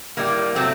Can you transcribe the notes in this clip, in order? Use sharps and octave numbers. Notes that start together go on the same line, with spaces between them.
A2 G3 A#3
C3 F#3 A3 C4